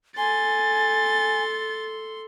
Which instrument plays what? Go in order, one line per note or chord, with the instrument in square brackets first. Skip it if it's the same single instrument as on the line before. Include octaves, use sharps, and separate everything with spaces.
[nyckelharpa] A4 C6 [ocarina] G#5 [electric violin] A6